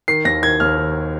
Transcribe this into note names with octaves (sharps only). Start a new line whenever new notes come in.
D#3 C7
D#2 A#6
D#3 G#6
D#2 F6
D#3